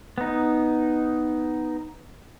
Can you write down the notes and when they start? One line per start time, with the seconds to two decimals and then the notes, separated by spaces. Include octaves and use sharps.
0.18 B3 D#4